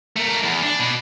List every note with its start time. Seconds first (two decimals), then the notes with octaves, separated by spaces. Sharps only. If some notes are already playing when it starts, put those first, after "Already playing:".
0.17 A3 A#4
0.44 E2
0.63 D4
0.80 B2